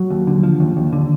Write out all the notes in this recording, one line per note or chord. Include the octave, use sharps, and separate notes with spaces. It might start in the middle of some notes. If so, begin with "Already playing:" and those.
Already playing: F#3
D#2
D3
F3
D#2
D#2
D3